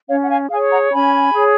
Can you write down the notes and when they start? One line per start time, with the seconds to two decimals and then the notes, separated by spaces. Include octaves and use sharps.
0.08 C#4 C#5 F5
0.22 F#5
0.29 F5 G#5
0.50 G#4 C#5 F5 G#5
0.71 F#5 A#5
0.92 C#4 G#5 B5
1.34 G#4 C#5